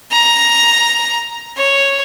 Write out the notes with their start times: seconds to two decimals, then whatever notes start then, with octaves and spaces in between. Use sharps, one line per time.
0.12 A#5
1.57 C#5